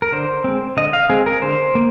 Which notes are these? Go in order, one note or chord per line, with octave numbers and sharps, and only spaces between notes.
A#4
D3 C5
G#3 C4
D3 D#5
F5
G#3 C4 G#4
A#4
D3 C5
A#3